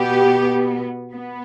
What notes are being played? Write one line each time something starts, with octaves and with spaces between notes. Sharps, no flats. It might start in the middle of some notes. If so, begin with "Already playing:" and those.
Already playing: B2 B3 G4
B3